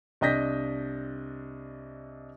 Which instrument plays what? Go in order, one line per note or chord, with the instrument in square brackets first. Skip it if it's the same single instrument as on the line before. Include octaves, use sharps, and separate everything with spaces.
[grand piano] C2 D4 D#5 G6 A#6 B6